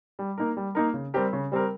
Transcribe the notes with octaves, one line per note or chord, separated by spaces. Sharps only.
G3
A#3 D#4 A#4
G3
A#3 D#4 A#4
C#3
G3 C4 G4 A#4
C#3
G3 C4 G4 A#4